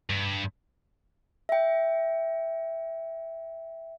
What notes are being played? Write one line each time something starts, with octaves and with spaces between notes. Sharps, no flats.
G2
E5 G5